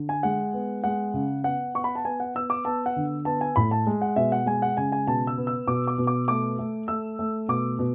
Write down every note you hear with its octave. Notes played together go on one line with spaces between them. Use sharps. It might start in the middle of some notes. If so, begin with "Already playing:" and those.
Already playing: D3
G#5
G#3 F#5
B3
G#3 F#5
C#3
B3 F#5
B3 C#6
B5
A5
B3 G#5
F#5
B3 E6
D6
B3 A5
F#5
D3
B3 A5
G#5
A2 B5
A5
G#3
F#5
B2 E5
F#5
G#3 G#5
F#5
C#3 G#5
G#5
B2 A5
E6
B3
E6
B2 D6
D6
B2
D6
A3 D6
A3
A3 E6
A3
B2 D6
B2